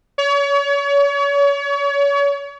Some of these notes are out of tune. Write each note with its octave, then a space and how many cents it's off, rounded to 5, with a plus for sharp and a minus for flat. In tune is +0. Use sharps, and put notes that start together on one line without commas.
C#5 +35